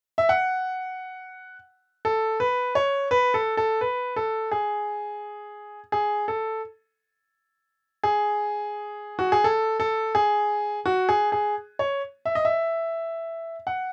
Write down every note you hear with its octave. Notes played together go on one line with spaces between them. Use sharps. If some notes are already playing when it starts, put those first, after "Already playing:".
E5
F#5
A4
B4
C#5
B4
A4
A4
B4
A4
G#4
G#4
A4
G#4
F#4
G#4
A4
A4
G#4
F#4
G#4
G#4
C#5
E5
D#5
E5
F#5